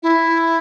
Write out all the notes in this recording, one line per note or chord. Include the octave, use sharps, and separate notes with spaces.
E4